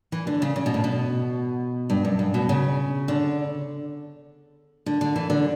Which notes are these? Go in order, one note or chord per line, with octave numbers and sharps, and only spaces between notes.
E3
D3
C#3
C#3
B2
A2
B2
G2
F#2
G2
B2
C#3
D3
D3
D3
E3
D3